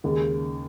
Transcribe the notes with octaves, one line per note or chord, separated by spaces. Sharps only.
D#2 C#3 G#3